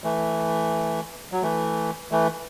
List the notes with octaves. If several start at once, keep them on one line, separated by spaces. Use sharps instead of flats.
E3 A3
F#3
E3 A3
E3 A3